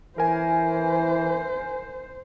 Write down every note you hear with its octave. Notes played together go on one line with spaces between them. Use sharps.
E3 A#4 C5 G#5